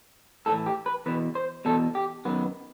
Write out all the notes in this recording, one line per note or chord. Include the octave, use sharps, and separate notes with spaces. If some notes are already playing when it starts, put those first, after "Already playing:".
A2 E3 A4
G4
B4
E2 B2 B4
C5
E2 B2 A4
G4
F#2 D#3 B3